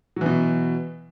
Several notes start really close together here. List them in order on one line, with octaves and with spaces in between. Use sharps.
F#3 E3 B2